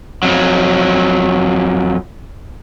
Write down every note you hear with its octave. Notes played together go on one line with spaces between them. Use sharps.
F2 F#3